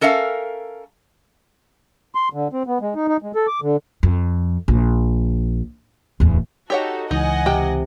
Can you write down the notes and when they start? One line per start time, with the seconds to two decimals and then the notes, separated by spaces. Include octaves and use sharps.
0.01 C#4 A4 A#4 E5 F5 G5
2.15 C6
2.33 D3
2.53 C4
2.67 B3
2.81 G#3
2.95 D#4
3.08 D#4
3.22 G#3
3.35 A4
3.47 D6
3.62 D3
4.03 F2
4.68 A#1
6.20 D1 E2
6.70 D#4 F#4 G4 A4 C#5 F#5
7.11 C#2 E3 D#4 D#5 F#5 G#5
7.46 C3 G5